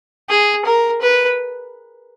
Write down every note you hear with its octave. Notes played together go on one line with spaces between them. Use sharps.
G#4
A#4
B4